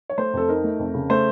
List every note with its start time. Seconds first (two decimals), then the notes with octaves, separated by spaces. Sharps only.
0.10 C#5
0.18 A3 C5
0.34 F2 A4
0.48 D#4 A#4
0.64 A3
0.79 F2
0.94 C#3
1.10 A3 C5